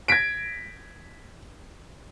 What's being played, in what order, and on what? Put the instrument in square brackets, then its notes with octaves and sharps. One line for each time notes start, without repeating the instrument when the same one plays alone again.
[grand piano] G#6 A#6 B6 D7